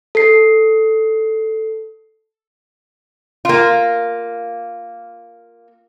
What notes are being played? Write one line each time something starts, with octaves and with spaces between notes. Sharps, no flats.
A4 C7
A#3 F4